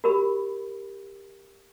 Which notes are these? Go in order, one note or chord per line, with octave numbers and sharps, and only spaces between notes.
F#4 G4 A#4 B5